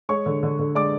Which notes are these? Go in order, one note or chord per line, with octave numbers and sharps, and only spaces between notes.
G#3 C#5 C#6
D3
D3
D3
G#3 D5 D6